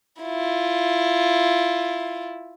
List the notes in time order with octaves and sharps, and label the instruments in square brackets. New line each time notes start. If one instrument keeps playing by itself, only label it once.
[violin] E4 F4